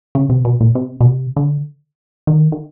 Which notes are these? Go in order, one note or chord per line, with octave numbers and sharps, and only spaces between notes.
C#3
C3
B2
A#2
C3
B2
C3
D3
D#3
D#3